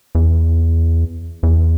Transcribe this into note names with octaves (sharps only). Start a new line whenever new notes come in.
E2
E2